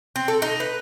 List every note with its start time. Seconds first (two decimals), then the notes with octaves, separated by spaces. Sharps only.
0.16 C4
0.28 A4
0.42 D#4
0.60 B4